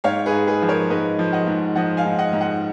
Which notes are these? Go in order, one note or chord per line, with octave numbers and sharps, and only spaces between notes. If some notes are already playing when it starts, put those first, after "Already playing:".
G#2 C#5 F5
G#4 B4
G#2
G#4 B4
F3
A#4 C#5
G#2 B4 D#5
F3
D#5 F#5
G#2
F3 D#5 F#5
F5 G#5
G#2
D#5 F#5
G#2
D#5 F#5